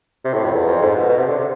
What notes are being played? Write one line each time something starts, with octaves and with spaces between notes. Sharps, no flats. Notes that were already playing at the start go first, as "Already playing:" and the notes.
C3
A2
F2
E2
F2
G#2
B2
B2
C3
D3
C3